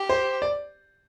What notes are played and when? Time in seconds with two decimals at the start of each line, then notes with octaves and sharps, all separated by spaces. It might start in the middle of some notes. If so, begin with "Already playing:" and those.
Already playing: G4
0.09 C5
0.42 D5